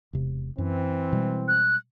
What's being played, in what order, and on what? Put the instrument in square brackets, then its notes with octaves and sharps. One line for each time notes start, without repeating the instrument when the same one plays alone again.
[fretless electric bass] E1 C3
[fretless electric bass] F#2 [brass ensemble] E3 C4
[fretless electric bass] B2 G3 G#3
[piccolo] F#6